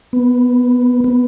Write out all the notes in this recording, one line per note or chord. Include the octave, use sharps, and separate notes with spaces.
B3
B3